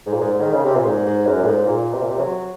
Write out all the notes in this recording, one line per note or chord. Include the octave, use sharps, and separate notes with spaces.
G#2
A#2
G#2
D#3
C#3
C3
A#2
G#2
G#2
F#2
A#2
G#2
A#2
C3
A#2
C3
F#3